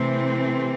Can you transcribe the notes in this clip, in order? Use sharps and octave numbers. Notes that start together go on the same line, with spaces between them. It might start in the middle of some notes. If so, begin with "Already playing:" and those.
Already playing: C3 E3 A3 C4